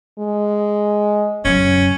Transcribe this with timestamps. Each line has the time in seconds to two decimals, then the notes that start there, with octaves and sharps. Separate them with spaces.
0.19 G#3
1.45 F#2 C#3 C#4